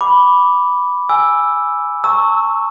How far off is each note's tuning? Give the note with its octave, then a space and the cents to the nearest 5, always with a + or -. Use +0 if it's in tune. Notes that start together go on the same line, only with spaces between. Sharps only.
B5 +0 D6 -10
G#5 +0 E6 +0
A5 +45 C#6 +0 E6 -20